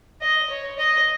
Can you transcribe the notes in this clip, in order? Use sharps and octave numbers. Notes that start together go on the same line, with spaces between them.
D#5
C#5
D#5